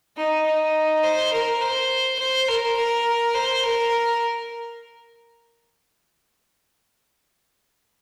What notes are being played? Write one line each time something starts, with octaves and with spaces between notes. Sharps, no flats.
D#4
D#4
C5
A#4
C5
C5
A#4
A#4
C5
A#4